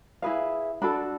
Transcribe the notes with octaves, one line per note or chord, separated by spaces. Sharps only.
E4 G#4 B4 F5
D4 F#4 A4 B5